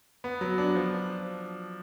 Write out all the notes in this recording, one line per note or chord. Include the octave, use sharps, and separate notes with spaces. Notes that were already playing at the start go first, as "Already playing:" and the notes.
B3
F#3
D4
F3